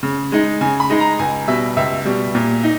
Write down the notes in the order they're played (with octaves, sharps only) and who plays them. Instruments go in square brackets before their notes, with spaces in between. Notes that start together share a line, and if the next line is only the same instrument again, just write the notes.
[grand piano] C#3
G#3 D#4
C#3 G#5
B5
G#3 D#4
A#5
C#2 G#5
B2 G3 E5
C#2 E5
B2 G3
A#2
D#4